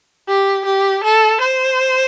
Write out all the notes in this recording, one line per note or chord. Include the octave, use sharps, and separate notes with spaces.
G4
G4
A4
C5